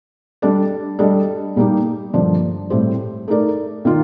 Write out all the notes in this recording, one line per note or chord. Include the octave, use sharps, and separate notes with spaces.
G3 D4 A4 D5
G3 D4 A4 D#5
A#2 G3 A#3 D#4 G4
G2 D3 F3 A#3 D4
A2 G3 C4 G4 C5
A3 D#4 A#4 D5
D#3 A#3 F4